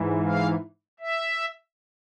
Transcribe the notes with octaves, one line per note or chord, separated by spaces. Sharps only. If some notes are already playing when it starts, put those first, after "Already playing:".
Already playing: G#2 E3
F5
E5